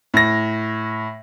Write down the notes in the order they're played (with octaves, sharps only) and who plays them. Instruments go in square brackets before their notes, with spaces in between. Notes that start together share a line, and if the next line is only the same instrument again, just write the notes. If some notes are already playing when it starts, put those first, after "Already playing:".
[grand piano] A2 A#6